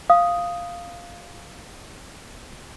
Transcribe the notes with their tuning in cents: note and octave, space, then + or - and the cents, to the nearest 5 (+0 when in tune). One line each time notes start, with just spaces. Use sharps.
F5 +0 D#6 +0